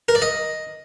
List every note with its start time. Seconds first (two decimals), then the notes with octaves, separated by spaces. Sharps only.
0.09 A#4
0.15 D5
0.22 D#5